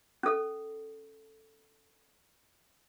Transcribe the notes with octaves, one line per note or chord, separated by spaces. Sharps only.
C#4 A4